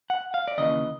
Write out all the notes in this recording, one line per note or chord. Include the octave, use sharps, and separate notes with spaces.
F#5
F5
D5
D#2 C#3 E3 D#5